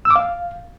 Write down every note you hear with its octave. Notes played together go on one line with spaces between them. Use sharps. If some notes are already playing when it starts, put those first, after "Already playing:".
E6
D6
F5